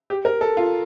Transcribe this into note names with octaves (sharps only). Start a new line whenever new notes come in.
G4
A#4
A4
F4